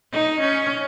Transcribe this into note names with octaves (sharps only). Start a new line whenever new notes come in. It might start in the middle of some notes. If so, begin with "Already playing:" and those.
D#4
C#4